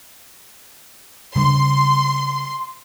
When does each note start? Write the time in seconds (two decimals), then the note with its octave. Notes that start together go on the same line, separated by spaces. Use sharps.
1.36 C#3 G3 D4 C6